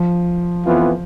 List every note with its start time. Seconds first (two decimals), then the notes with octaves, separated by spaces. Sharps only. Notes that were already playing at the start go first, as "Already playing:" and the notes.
Already playing: F3
0.65 F2 E3 B3 F4